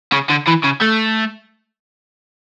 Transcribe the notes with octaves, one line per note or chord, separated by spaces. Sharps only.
C#3
D3
E3
C#3
A3